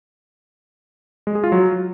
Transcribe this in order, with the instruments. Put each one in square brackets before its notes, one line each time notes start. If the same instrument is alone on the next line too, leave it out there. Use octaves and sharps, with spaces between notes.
[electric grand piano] G#3
G#4
F4
F#3